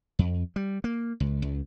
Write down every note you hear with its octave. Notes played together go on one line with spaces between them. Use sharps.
F2
G3
A#3
C#2
C#2